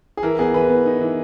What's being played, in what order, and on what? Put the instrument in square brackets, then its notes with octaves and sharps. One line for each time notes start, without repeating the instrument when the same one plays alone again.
[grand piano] G#4
[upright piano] E3 [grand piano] A#4
[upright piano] B3 [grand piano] G#4
[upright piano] E3 [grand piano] B4
[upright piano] B3
D#4
E3